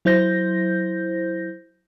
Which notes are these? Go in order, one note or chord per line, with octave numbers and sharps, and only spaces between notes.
F#3 E4 C5 G6 A#6